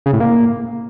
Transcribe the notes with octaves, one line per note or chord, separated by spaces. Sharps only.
C#3
A2
A#3